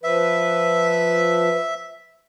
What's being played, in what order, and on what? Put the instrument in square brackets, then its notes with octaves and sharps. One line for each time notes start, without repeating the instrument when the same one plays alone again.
[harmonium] F3 B4 [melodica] E5